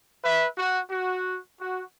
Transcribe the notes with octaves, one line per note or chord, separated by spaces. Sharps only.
B4 E5
F#4
F#4
F#4